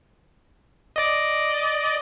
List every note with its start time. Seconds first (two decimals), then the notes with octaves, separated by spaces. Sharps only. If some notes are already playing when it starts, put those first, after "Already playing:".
0.96 D5 D#5